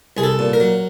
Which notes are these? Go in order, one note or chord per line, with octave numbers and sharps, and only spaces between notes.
C2 G#4
A4
A#2
A#4
F#3